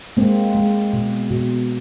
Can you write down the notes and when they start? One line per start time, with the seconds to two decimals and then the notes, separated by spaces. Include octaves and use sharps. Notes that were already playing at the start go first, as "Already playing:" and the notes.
0.17 G#3 A#3 C4
0.55 G#3
0.93 B2
1.31 B2